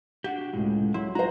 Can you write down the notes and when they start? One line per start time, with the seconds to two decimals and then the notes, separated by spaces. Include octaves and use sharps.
0.24 D4 F#4 G4 F#5
0.53 C#2 A2 G#3
0.94 F#3 E4 C6
1.15 F4 F#4 C5 A#5